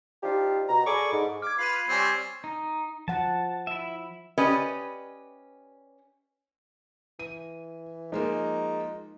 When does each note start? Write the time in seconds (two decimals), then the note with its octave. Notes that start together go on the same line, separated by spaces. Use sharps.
0.23 F3 D4 D#4 F4 G4
0.69 B2 A#5
0.86 G#4 A4 D5 B5 C#6 D6
1.13 G#2
1.42 D6 F6 G#6
1.59 F4 B4 B5 C7 D#7
1.89 G3 C4 C#5 G#5 G#6 C7
2.44 D#4
3.08 F3 F#5 A5
3.67 E4 E5
4.38 C#4 G4 B4 D5 D#5
7.19 E3 D#7
8.12 F3 G#3 A#3 D#4